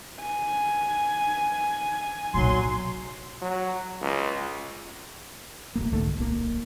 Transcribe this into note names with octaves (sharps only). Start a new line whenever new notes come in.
G#5
B1 A#2 F#3 C6
F#3
C#2
D#1 D#2 A#3
C2 G#2 D3 A3
D1 B1 C#3 A#3